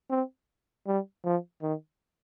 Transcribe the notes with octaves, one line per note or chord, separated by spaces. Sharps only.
C4
G3
F3
D#3